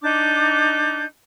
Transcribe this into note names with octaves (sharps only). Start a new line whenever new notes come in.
D4 D#4 D6 G6